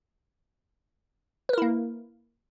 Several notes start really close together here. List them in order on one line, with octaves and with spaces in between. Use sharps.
B4 A#4 E4 A#3